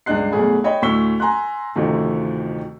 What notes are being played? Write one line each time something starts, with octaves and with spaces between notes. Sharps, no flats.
C#2 G2 D4 D#5 F#6 C7
B1 E2 A3 G#4 B5
C#5 D#5 G5 B5
D2 A2 C#6 E6 B6 G7
G#5 A#5 C6 F#6
A1 D2 C3 D#3 F3 A3